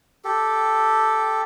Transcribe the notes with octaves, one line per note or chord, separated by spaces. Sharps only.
G4 A4